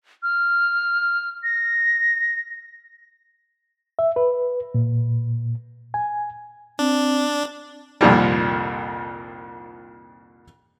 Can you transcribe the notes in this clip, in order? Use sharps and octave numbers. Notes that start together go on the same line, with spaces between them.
F6
A#6
E5
B4
A#2
G#5
C4 D4
C2 F2 A#2 D#3 F3 G3